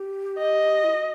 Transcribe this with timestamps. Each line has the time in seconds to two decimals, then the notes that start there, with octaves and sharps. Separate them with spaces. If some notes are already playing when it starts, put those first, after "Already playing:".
Already playing: G4
0.38 D#5
0.84 E4
0.95 F#4